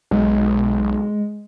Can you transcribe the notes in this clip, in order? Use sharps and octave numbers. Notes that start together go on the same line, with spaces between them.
B1 G#3